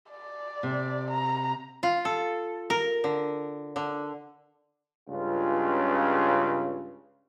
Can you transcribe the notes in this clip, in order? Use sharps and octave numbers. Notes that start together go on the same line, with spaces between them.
D5
C3
A#5
F4
A4
A#4
D3
D3
C#2 G2 C#3 F4